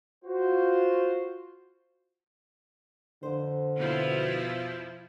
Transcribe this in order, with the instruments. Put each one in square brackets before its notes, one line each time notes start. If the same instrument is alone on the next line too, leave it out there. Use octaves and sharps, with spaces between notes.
[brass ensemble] F4 F#4 C5
[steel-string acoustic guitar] F2 C5 [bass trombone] D3
[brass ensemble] B2 [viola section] F3 E4